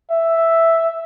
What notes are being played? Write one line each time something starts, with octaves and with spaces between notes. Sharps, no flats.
E5